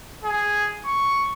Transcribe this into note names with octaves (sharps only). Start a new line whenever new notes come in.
G#4
C#6